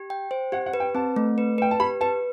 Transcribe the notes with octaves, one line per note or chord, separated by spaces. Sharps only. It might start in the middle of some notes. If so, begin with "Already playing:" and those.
Already playing: G4
G5
C5
G4 F#5
F#5
B4
G5
C4 A5
A3
B4
B4 G5
A5
G4 B5
B4 A5